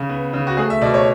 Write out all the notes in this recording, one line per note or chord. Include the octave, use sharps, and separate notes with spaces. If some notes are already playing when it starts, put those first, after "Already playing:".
Already playing: C#3
B3
C#3
F#4
A3 G#4
E5
B2 D5
C#5